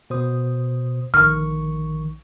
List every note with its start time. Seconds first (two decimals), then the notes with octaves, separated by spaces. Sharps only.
0.10 B2 C5 D#6
1.14 A#1 D#3 C#6 F6